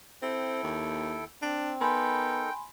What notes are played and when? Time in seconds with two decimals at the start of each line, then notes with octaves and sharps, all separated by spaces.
0.22 C4 E4 A4 G5
0.64 D#2
1.42 C4 D4
1.81 B3 D#4 A4 A#4 G5 G#5 B5 C6